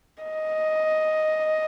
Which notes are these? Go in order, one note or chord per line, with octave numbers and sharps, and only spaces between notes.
D#5